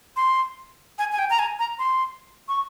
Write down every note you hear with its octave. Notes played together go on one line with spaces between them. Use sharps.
C6
G#5
G#5
G5
A#5
G#5
A#5
C6
C#6